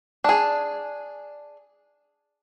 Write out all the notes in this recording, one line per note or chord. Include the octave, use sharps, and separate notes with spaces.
D4 G#4